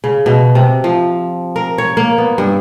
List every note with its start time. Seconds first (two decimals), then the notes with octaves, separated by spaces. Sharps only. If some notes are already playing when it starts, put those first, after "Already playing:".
0.04 C#3
0.26 B2
0.55 C3
0.84 F3
1.56 A#4
1.78 C#5
1.97 A#3
2.18 B3
2.38 G2